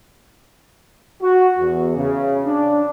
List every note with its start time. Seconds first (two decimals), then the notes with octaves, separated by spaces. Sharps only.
1.22 F#4
1.59 E2
1.96 C#3
2.46 D4